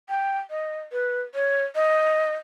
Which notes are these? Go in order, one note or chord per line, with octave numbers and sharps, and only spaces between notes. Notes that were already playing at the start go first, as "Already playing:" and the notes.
G5
D#5
B4
C#5
D#5